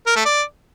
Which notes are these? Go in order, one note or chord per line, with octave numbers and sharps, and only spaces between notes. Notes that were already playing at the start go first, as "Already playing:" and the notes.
A#4
A3
D5